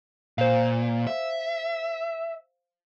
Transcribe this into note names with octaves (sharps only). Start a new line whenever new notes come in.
A#2 C5 F5
E5